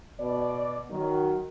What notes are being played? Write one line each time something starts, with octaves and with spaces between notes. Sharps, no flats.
B2 D5
D#3 F#3